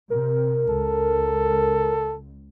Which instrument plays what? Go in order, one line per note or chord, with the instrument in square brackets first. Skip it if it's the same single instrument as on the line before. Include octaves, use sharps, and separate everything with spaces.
[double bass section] C3 [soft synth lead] A#4
[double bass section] C#2 [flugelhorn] A4